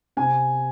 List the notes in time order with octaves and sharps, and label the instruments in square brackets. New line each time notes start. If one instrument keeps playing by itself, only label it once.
[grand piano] C3 G#5